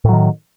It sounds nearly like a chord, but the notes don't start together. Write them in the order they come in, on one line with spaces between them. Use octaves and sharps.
A2 F#3 D#3